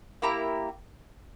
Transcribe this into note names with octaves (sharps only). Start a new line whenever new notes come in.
A#3 E4 G4 A#5